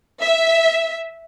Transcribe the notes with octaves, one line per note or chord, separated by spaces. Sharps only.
E5